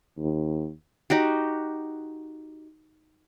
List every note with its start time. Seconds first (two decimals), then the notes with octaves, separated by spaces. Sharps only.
0.18 D#2
1.10 D#4 F#4 G4